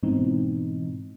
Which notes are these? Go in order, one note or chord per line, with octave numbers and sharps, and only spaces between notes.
G#2 B2 E3 C4 D#4